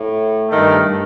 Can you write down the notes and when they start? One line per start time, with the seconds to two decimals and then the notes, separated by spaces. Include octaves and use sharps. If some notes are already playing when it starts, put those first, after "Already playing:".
Already playing: A2
0.49 G2 D#3 A3